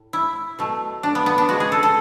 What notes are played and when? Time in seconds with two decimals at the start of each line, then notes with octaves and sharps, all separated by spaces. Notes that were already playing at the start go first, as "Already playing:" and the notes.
Already playing: A2
0.13 E4
0.59 B2 F#3 A3
1.03 D4
1.15 B3
1.26 B3
1.38 D4
1.49 C#3 G#3 F#4
1.60 G#4
1.72 A4
1.83 A4